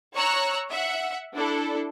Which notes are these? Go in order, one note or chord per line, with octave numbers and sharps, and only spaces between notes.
C#5 A#5 C#6 E6 F#6
E5 F#5
D4 E4 A4